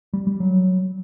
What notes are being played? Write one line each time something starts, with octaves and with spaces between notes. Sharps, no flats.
G3
G3
F#3